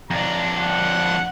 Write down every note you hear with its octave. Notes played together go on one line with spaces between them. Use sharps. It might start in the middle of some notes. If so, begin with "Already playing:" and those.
F2 D4 A#5
F#5